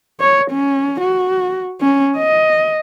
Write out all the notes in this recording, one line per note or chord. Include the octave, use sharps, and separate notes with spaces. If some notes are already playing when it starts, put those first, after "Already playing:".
C#5
C#4
F#4
C#4
D#5